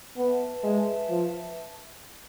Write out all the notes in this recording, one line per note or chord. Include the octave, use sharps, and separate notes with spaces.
B3 B4 E5 A5
G#3
F3